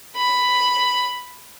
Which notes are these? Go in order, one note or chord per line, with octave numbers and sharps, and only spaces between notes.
B5